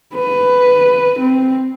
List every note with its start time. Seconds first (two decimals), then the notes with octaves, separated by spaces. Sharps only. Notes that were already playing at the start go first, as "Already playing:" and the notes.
0.14 B4
1.19 C4